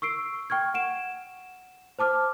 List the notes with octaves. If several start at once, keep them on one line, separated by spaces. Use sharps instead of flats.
C#6 E6 C7 D7
G5 C#6 F6 G#6
F#5 D7 E7
C5 A5 D6 F6